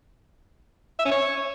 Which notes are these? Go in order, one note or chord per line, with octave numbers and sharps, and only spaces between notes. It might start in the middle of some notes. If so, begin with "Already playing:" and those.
E5
C#4
C#5